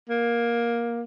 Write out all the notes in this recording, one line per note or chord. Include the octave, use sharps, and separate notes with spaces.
A#3